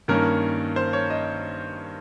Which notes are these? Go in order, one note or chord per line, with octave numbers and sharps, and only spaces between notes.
G2 D#3 A#3 C#4 A#4
C5
C#5
D#5